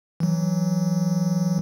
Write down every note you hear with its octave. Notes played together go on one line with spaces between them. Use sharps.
E3 F#3